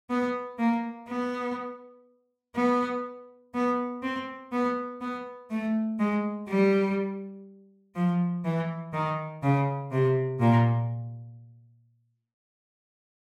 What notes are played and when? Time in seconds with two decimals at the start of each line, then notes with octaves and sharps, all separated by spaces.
0.10 B3
0.59 A#3
1.09 B3
2.55 B3
3.54 B3
4.03 C4
4.52 B3
5.01 B3
5.50 A3
5.99 G#3
6.48 G3
7.95 F3
8.45 E3
8.93 D#3
9.43 C#3
9.92 C3
10.40 A#2